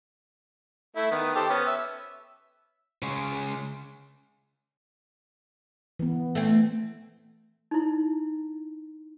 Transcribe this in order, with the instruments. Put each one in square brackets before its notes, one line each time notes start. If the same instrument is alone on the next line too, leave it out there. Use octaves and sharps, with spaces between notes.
[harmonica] A3 E4
D#3 B3
G4 A4 C5
B3 C#4
E5
[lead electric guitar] C#3 G#3
[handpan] E3 B3
[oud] A3 C4
[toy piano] D#4 E4